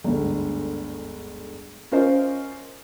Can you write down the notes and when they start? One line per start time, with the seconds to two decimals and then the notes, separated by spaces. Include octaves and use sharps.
0.04 G1 D2 G#2
1.92 C#4 F4 A#4 C5 D#5